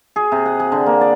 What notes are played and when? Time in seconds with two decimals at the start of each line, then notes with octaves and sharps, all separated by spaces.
0.16 G#4
0.32 C3
0.45 F#5
0.60 G#4
0.72 D3
0.86 A#3
1.01 D5